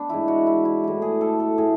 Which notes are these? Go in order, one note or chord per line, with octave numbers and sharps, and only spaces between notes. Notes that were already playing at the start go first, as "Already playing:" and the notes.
Already playing: B3 D4
G#2 E3 E4
F#4
E4
E4
A2 E3
G#4
A4
A4
A2 G#4